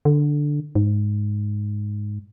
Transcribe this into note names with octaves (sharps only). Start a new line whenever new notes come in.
D3
G#2